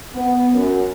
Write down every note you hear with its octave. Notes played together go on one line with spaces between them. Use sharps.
B3
F#2